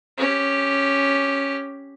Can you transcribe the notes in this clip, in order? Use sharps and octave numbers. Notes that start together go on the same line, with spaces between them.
C#4 G4